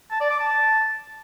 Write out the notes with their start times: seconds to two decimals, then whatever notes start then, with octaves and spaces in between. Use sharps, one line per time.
0.11 A5
0.21 D5
0.30 D6
0.39 A5